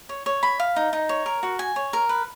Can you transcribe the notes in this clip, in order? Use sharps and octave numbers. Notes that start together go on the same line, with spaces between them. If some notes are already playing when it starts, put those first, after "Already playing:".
C#5
C#5
B5
F5
D#4
D#4
C#5
A#4
F#4
G#5
C#5
A#4
B4